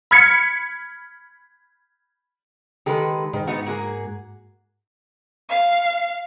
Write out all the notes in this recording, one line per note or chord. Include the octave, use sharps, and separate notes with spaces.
B5 F6 G#6 B6 C#7
D#3 G#3 G4 A4 B4
G#2 D#3
B3 D#4 F#4
A#3 F#4 G#4
F5